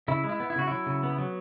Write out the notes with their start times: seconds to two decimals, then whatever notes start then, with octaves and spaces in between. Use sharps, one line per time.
0.08 C#3 E4
0.24 G#3
0.29 E4
0.40 B3
0.50 E4
0.56 C#3 F#4
0.67 F#3 E4
0.86 C#3
1.03 B3
1.18 F#3